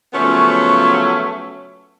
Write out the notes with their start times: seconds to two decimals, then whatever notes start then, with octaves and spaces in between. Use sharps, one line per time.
0.13 C#3 F3 F#3 A3 B3 C#4